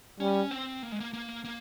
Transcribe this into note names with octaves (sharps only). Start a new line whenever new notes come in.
G3 C#4
C4
A#3
G#3
A#3
A#3
A#3